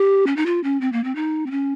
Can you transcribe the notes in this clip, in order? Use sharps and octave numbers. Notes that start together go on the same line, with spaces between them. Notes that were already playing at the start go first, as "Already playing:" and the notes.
Already playing: G4
C#4
D#4
F4
C#4
C4
A#3
C4
D#4
C4
C#4